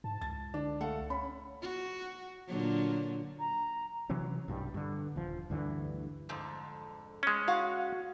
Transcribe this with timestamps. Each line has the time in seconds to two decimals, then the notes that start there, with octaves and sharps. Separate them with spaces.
0.04 G#2 A5
0.21 C#2 A6
0.54 D3 D4
0.81 A3 A4 F5 F#5
1.10 C#4 B5
1.62 F#4
2.47 A#2 D3 F#3
3.39 A#5
4.09 C3 E3 F#3 C#4
4.48 B1 G2 F3 G3
4.74 G2 D3
5.16 D#1 F3
5.50 D2 G2 D3 E3
6.29 F2 G#2 D3
7.23 G#3 C#4
7.48 F#4 F5 F#5